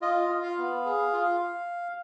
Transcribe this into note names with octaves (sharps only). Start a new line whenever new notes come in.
F4 D#5
F4
F5
B3
G#4
F4